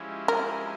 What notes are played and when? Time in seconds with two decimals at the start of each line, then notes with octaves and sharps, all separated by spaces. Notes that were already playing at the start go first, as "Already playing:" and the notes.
Already playing: F3 G#3 C#4 E4 G4
0.28 A#4